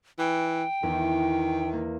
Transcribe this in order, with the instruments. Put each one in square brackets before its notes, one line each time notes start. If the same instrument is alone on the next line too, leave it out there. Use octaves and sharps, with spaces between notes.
[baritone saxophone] E3 [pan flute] G5
[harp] E2 [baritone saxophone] D#3
[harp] A#3